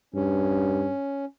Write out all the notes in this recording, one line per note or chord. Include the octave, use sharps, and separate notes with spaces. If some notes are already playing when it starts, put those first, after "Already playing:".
G2 C#4